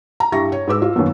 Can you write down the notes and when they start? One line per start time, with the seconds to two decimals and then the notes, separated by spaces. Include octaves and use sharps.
0.20 A#5
0.32 G2 E4 G4 E5 C#6 A#6
0.52 C#5
0.67 G#2 B4 D6 E6
0.82 F4
0.96 F#2 D#3 A#3 B3